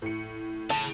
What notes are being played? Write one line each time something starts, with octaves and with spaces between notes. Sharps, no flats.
A2 C#7
C#3 A5